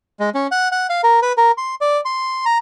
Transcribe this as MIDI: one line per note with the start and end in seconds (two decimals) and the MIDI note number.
0.20 0.30 56
0.35 0.47 61
0.52 0.68 78
0.72 0.87 78
0.90 1.01 77
1.04 1.20 70
1.22 1.33 71
1.37 1.51 70
1.58 1.75 84
1.81 2.01 74
2.05 2.45 84
2.45 2.58 82